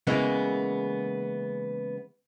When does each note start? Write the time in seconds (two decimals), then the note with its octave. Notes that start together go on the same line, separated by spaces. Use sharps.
0.07 C#3 E3 G#3 A#3 B3